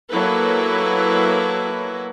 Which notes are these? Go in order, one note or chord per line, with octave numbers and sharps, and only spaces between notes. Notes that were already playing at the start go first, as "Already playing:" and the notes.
F#3 A#3 E4 A4 B4